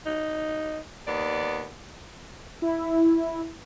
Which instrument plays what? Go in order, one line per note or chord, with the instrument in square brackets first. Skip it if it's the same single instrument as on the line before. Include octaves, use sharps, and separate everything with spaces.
[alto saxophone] D#4
[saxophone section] D#2 B3 D5
[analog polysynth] E4